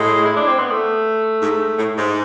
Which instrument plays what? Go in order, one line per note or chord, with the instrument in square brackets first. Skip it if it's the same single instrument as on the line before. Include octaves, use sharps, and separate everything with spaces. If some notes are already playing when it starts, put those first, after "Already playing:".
Already playing: [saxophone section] A2 [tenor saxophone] G#3
[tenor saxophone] E4
D4
C4
B3
A3
[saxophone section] G#2
A2
G#2